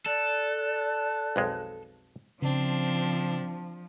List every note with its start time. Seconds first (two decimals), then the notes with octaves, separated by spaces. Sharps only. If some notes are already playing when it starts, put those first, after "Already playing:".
0.06 A4 D5 F#6
1.36 B1 F2 G#3
2.42 C#3 F3 C4 D4